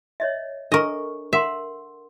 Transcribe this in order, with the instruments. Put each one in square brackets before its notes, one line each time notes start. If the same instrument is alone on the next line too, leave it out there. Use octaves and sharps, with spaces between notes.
[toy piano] C#5 D#5 E5
[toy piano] D4 A4 C#6 [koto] A#4 D#5
[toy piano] A#4 F#5 C6 [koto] E5